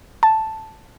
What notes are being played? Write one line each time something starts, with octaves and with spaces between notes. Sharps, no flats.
A5